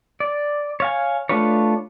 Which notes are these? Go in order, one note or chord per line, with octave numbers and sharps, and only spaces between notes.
D5
C#5 F5 G#5
A3 D4 F4 B4 C#5